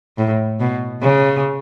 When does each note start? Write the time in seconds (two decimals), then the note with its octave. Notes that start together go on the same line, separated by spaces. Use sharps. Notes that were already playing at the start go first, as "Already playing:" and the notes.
0.18 A2
0.60 B2
1.02 C#3